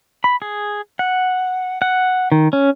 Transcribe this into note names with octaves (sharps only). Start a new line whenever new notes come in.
B5
G#4
F#5
F#5
D#3
C#4